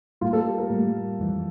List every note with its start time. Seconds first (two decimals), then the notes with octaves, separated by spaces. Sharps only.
0.21 A2 G3 A#3 F4
0.33 A4
0.46 G4
0.58 A#4
0.70 A2 G3 A#3
1.20 F2 E3 G3